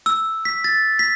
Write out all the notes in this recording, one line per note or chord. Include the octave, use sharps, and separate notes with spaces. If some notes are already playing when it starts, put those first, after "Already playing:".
E6
B6
A6
B6